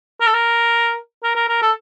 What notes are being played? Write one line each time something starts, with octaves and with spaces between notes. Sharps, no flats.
A#4
A4
A#4
A#4
A#4
A#4
A4